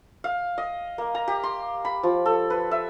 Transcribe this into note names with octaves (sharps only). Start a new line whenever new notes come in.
F5
D#5
A#3
A#5
G4
C6
B5
F3
A4
B4
E5